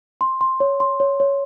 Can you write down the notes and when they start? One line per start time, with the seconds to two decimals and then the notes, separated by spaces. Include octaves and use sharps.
0.21 C6
0.41 C6
0.60 C#5
0.80 C6
1.00 C#5
1.20 C#5